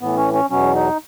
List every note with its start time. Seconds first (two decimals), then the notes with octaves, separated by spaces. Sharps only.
0.01 A2 E3 B3
0.17 C#4
0.34 C#4
0.50 E2 B2 F#3 C#4
0.75 D#4